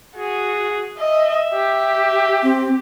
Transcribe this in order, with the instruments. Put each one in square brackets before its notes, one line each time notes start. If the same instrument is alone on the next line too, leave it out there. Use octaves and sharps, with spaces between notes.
[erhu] F#4 [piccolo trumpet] G#4
[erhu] D#5 [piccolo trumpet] E5
[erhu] G4
[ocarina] C4